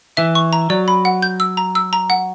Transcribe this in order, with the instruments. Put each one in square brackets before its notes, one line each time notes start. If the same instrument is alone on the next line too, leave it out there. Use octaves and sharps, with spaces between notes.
[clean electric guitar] E3 [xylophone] E5
[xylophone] C#6
A#5
[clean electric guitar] F#3 [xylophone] D5
[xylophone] B5
F#5
G6
E6
A#5
E6
A#5
F#5